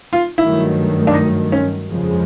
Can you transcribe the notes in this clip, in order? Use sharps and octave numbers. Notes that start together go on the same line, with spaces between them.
F4
G2 D#3 F#3 A3 E4
D4
D#4
C#4
F2 C#3 F3 G#3